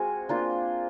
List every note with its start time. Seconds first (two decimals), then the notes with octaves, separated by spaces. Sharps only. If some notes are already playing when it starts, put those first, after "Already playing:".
Already playing: G#3 C4 F4 F#4 G#4
0.29 A#3 D4 F4